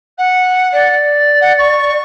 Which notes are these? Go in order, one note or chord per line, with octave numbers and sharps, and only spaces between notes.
F#5
D5
F#5
C#6